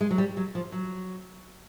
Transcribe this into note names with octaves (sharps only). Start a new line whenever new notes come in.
G#3
F#3
G3
F#3
F3
F#3